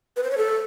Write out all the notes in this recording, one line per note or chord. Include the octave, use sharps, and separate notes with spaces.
B4
C5
C#5
A4